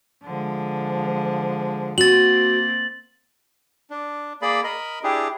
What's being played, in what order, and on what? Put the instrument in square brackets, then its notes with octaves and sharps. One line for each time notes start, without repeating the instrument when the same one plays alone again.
[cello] D3 G#3 [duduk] F3
[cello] A#3 C4 [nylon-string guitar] F#4 [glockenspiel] A6 F#7
[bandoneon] D4
A#3 G#4 D5 B5
A#4 D#5 B5
D4 E4 G4 G#4